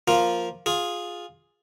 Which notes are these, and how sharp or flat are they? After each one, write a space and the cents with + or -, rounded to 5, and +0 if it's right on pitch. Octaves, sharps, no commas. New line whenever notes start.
F3 +0 A#3 +0 F4 +0
F4 +10 G#4 +0